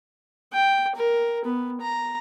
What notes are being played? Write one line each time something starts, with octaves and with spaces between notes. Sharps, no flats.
G5
A#4
B3
A#5